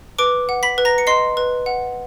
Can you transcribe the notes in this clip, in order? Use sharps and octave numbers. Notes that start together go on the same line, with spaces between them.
B4 D6 D7
F#5
B5 B6
B4
A#5 A#6
C#7
D#5 C6 C7
B4
F#5